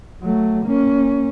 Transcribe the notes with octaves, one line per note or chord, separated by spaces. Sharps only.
F#3 A3
A#3 C#4